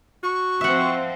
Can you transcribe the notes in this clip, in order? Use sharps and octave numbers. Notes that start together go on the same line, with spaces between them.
F#4 C#6
F3 C4 E5 F#5